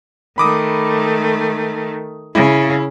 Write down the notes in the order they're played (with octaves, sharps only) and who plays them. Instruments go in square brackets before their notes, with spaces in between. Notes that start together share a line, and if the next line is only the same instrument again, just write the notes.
[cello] D#3 A3 [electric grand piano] B5 D6 D#6
[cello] C#3 [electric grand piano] E4